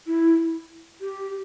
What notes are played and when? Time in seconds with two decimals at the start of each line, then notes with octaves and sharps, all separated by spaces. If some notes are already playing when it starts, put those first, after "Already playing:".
0.07 E4
1.01 G4